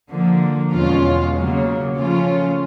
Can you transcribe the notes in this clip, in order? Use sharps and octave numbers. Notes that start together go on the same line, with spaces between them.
D3 F3 A#3
E2 B2 G#3 C#4 F4
C#3 F#3 A#3
C#3 F3 A3 C#4 F4